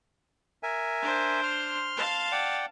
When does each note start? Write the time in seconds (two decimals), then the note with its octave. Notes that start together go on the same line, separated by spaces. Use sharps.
0.63 A#4 E5 G#5
1.02 D4 C5
1.43 C6 F6
1.97 F5 A5
2.32 D5 F#5 G5